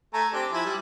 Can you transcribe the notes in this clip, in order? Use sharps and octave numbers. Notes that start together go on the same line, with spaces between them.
A3 G#5 A#5
C4 D4 G4
F3 E4 G#5
G3